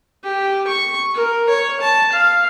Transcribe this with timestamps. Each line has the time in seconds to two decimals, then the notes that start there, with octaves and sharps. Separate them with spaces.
0.24 G4
0.67 C#6
1.14 A#4
1.49 C#5
1.81 A5
2.12 F5